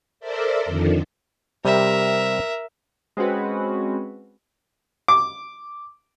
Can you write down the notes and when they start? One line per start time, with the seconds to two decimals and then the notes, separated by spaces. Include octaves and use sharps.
0.20 A4 A#4 C5 D5 E5
0.65 F2 D3 D#3 F3
1.65 C3 G3 C4 A#4 E5
3.17 G#3 C4 C#4 F#4 B4
5.08 D6